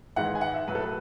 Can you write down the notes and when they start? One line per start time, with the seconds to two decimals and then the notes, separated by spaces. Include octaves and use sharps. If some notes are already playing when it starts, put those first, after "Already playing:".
0.16 G#1 G#2 E3 G#3 F#5
0.35 G#5
0.41 F#5
0.54 E5
0.68 B1 A2 F#3 B4
0.75 A4
0.82 B4